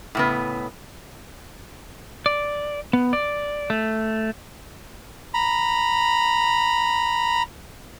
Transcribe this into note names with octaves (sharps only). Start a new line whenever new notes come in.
A2 C#3 B3
D5
B3
D5
A3
A#5 B5